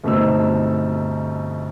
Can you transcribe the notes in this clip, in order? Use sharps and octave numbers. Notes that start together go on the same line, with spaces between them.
G1 B2 A3 C4 D#4 E6